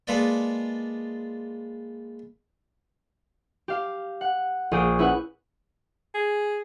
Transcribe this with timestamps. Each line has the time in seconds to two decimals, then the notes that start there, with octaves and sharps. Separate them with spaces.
0.07 G#3 A#3 F4 A4 B4 D5
3.68 G4 F5
4.21 F#5
4.71 A#1 G#4 G6 D7
4.99 C#4 E4 B4 F#5
6.14 G#4